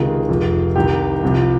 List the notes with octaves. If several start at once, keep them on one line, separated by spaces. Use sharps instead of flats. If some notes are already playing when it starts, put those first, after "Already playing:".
Already playing: C#2 C3 D#3 G#4
F1 F2 C3
C2 C3 D#3 G4
C2 C3 F3